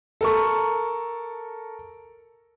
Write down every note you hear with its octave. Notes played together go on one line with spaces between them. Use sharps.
A4 A#4 C#6